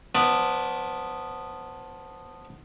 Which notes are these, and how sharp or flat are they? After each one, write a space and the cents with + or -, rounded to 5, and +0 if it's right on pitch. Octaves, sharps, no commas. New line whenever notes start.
F3 +20 B3 +0 D5 +0